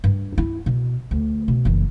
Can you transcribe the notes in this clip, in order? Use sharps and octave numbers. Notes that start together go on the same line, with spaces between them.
G2
E4
B2
D2
B2
F#1 E3